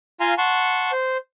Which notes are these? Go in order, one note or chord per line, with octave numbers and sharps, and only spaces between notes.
F4 F5 G#5 A#5 C6
F#5 A5 C6 C#6
C5